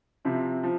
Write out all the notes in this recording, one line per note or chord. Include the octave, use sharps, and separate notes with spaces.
C3 F3 C4 E4
F3